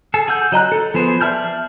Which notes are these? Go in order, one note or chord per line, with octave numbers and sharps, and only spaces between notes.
G#4 A4
G#4 F#5 E6 G6
F#3 D#5 A#5 F#6
A4
F3 B3 G#4 C5
D5 E5 A5 F6 G6